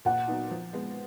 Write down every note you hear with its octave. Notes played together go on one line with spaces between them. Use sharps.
A#2 F#5
F#3 B3 D#4
F3
G#3 B3